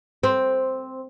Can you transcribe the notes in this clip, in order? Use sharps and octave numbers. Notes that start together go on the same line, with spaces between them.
C4